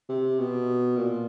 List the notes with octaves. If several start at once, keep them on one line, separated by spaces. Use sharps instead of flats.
C3
B2
A#2